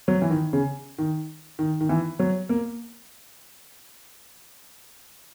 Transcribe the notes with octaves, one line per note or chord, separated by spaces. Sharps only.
F#3
E3
D#3
C#3
D#3
D#3
D#3
E3
F#3
A#3